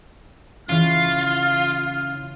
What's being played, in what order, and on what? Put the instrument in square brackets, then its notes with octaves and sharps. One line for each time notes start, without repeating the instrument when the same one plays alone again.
[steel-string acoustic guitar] C#3 E3 C#5 [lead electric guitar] F4 [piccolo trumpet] F6